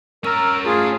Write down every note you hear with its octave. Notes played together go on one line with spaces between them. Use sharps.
C#4 A#4 A#5 E6
A3 F4 G#4